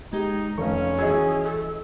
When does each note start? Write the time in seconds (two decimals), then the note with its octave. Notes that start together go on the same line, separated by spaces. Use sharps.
0.13 G#3 D#4 G4
0.58 F1 C#4 F5 C#6
0.99 E3 F#4 G#4 D#5 E6 G#6
1.43 A4